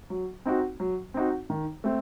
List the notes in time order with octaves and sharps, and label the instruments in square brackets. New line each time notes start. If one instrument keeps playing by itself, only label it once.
[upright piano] F#3
C4 D#4 F#4
F#3
C4 D#4 F#4
D#3
A3 C4